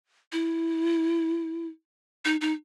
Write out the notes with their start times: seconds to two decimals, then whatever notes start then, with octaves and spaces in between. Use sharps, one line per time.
0.32 E4
2.25 D#4
2.41 D#4